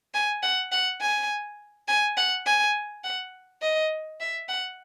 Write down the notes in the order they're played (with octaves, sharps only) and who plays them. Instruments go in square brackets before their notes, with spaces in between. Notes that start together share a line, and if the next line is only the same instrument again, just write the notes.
[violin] G#5
F#5
F#5
G#5
G#5
F#5
G#5
F#5
D#5
E5
F#5